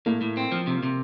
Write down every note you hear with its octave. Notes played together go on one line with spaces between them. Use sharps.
A2 A#3
A2
C4
F3
C3
C3